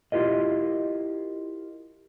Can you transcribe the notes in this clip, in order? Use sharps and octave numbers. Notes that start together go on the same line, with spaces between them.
E4 F4 G4 A#4 D#5